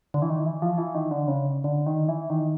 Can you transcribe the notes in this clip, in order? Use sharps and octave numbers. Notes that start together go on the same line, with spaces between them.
D3
E3
D#3
E3
F3
E3
D#3
D3
C#3
D3
D#3
E3
D#3